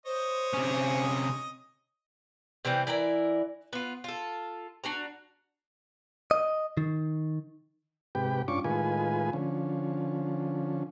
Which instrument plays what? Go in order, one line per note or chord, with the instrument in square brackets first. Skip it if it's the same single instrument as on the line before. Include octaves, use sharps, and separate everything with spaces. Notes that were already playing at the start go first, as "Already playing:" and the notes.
[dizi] C5 [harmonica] C#5 D#5 D#6
[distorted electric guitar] C3 C#4
[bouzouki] C3 E3 G3 C4
E3 E4 A#4 D5
B3 F4
F4 A4
D4 F#4 A#5
[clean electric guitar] D#5
D#3
[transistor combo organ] G#2 C3 G4 B4 G5
G2 C#4 D4 F4 C#6 D6
A2 D#3 G#3 F4 B4 G#5
D3 F3 C#4